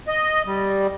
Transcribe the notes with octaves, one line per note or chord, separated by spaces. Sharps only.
D#5
G3